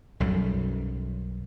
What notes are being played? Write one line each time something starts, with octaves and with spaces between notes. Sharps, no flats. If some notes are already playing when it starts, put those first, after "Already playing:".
B1 F#2 G3